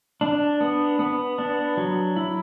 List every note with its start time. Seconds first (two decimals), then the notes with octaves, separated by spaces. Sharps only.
0.21 D4
0.61 B3
0.99 B3
1.38 D4
1.77 F#3
2.16 E4